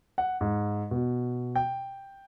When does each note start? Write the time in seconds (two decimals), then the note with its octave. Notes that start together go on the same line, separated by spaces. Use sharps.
0.18 F#5
0.41 G#2
0.91 B2
1.56 G5